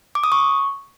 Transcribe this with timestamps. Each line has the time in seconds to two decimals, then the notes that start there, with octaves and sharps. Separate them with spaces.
0.15 D6
0.24 D#6
0.32 C#6